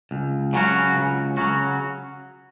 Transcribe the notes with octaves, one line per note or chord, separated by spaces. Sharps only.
C#2
C#3 F#3 C#4 F#4
C#2
C#3 F#3 C#4 F#4